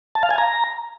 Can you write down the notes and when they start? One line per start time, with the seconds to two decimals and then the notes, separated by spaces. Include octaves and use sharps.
0.15 A5
0.23 F5
0.31 G#5
0.38 A#5